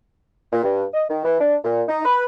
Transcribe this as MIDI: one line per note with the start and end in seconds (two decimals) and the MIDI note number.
0.52 0.63 46
0.63 0.84 43
0.94 1.04 75
1.08 1.23 51
1.24 1.37 52
1.40 1.54 62
1.63 1.82 46
1.88 2.01 63
2.05 2.24 71